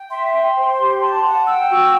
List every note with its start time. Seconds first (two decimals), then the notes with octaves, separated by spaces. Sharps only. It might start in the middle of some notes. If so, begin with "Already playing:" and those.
Already playing: G5
0.10 E5 C6
0.33 G5
0.55 C5
0.78 G4
1.01 A5
1.24 F#5
1.47 G5 E6
1.70 F#4